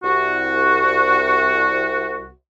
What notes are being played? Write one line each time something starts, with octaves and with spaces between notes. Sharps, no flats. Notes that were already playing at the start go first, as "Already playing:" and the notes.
C2 F#4